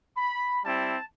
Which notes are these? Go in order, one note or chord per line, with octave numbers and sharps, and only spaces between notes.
B5
G3 C4 E4 A5